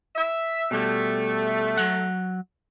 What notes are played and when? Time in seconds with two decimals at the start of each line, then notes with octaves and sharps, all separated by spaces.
0.15 E5
0.71 B2 G3 A3
1.77 F#3 F#5